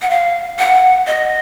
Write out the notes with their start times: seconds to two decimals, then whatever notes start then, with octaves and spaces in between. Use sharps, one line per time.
0.02 F#5
0.10 F5
0.59 F#5
1.07 D#5